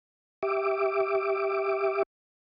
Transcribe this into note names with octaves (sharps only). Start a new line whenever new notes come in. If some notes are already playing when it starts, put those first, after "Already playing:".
G4 E5 D6